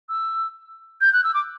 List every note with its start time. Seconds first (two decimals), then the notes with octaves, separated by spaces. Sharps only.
0.09 E6
1.01 G6
1.13 F#6
1.24 E6
1.34 D6